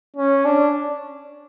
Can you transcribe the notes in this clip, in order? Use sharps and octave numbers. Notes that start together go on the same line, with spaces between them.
C#4
D4